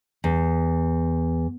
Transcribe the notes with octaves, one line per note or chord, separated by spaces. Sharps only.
E2